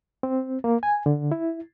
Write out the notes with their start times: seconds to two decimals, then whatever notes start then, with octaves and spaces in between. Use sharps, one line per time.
0.23 C4
0.64 A#3
0.83 G#5
1.06 D3
1.32 E4